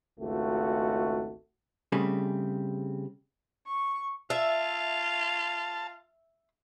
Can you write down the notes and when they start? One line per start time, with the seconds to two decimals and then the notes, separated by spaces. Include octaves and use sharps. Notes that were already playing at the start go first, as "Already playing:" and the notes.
0.20 G#1 C#2 A3 F#4
1.92 C#3 G3 A3 C4 G#4
3.68 C#6
4.30 F4 E5 A5